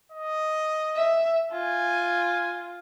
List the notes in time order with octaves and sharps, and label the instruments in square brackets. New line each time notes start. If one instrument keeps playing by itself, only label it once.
[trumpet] D#5
[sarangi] E5
[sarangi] F4 [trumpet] G#5